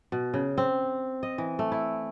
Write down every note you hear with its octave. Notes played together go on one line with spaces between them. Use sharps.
B2
C#3
C4
D#5
E3
A3
E4